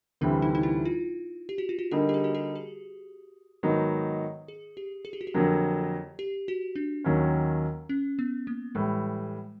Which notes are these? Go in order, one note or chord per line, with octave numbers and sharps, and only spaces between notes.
D2 C3 E3 G3 C4 D4
D#4
D#4
E4
F4
G4
F#4
F4
F#4
D3 G3 A#3 D#4 G4
G4
G#4
F#4
G4
G#4
G#2 D#3 F#3 B3 D#4
G#4
G4
G#4
G4
F#4
G4
F2 D3 F#3 A#3
G4
F#4
D4
D#2 D#3 F#3 A#3 C#4
C#4
B3
A#3
A2 E3 G3 G#3